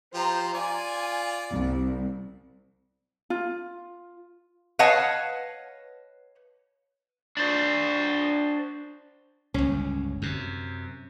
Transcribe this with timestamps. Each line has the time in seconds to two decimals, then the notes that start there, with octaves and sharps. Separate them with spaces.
0.14 F3 G4 C5 A#5
0.53 F4 D5 G#5
1.50 C2
3.30 F4
4.79 B4 C#5 D#5 F5 F#5 A5
7.37 D4 C5
9.54 G1 C#2 C#4
10.22 F#2 C3